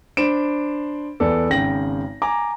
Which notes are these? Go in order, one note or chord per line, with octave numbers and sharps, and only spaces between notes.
D4 C5 B5 D7 E7
E2 B3 A4 D5
G#1 C#3 G5 A#6 F#7
G#5 A#5 D6